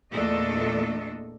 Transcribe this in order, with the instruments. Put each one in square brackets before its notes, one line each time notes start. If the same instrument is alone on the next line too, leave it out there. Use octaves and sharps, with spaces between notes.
[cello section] E2 A#2 A3 D4 A4 D#5